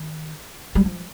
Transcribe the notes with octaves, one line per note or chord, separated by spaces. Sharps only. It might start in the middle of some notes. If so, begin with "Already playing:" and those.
Already playing: D#3
G3
F3